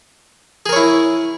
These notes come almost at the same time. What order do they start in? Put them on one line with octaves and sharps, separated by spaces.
G#4 A#4 C#5 E4